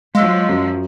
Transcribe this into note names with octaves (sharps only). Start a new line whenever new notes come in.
F3 F#3 G#3 F5 E6
F#2